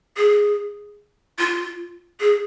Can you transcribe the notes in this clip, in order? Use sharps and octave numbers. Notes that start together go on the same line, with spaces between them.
G#4
F4
G#4